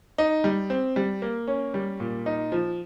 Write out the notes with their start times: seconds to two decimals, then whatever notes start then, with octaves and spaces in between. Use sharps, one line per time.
0.18 D#4
0.44 G3
0.70 C4
0.96 G3
1.22 A#3
1.48 C#4
1.74 G3
2.00 A#2
2.26 D#4
2.52 F3